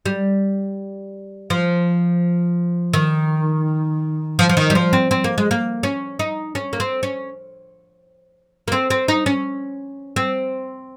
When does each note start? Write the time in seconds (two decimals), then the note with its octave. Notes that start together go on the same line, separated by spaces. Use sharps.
0.06 G3
1.50 F3
2.94 D#3
4.39 F3
4.49 F3
4.57 D#3
4.70 G3
4.75 F3
4.93 C4
5.11 C4
5.24 A#3
5.38 G#3
5.51 A#3
5.83 C#4
6.19 D#4
6.55 C#4
6.73 A#3
6.80 C4
7.03 C#4
8.68 A#3
8.72 C4
8.90 C4
9.08 D#4
9.26 C#4
10.16 C4